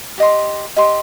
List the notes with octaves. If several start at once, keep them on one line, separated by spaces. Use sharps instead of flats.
G4 D#5 C6
G4 D#5 C6